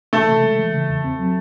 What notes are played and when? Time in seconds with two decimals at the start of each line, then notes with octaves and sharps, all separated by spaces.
0.13 E3 A3 A4
0.28 C3
0.44 G#3
0.58 E3
0.74 C#3
0.89 E2
1.04 C4
1.19 F#3